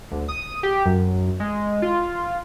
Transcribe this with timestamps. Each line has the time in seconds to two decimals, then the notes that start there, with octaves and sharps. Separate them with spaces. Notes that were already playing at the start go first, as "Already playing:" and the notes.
0.11 D2
0.28 D#6
0.63 G4
0.86 F#2
1.40 G#3
1.82 F4